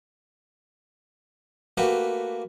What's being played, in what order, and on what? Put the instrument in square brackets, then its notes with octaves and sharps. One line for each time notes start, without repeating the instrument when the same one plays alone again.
[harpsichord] A3 A#3 F#4 G4 B4